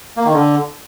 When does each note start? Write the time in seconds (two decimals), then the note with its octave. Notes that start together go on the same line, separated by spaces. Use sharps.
0.17 A#3
0.25 D#3
0.33 D3